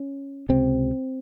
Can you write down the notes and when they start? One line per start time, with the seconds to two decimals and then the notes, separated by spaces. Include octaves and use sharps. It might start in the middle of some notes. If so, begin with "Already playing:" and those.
Already playing: C#4
0.49 C#2 C3 C4